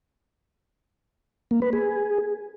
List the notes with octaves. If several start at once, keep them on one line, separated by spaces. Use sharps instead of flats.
A#3
B4
G#4